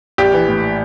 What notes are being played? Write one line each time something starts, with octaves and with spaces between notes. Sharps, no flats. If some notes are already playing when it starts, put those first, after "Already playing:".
A#1 G4
E3
A2